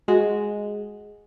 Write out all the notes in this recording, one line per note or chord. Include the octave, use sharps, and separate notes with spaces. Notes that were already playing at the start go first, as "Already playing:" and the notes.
G#3 F#4